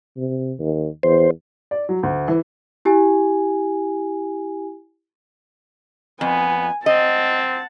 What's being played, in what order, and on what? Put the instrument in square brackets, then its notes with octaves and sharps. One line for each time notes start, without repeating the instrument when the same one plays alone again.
[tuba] C3
D#2
[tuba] E2 [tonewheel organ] C5
[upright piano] D5
F#3
D2
E3
[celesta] E4 G4 G#5
[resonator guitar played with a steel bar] F2 [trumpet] B3 [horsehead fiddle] G#5
[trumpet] C4 [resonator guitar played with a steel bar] D#5 [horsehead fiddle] F#5 A5